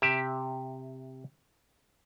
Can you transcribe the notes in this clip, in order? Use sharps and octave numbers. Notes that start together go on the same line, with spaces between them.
C3 G4 E5